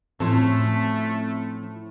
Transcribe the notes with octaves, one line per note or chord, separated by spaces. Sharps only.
A2 F3 A3 C4 C#4 C6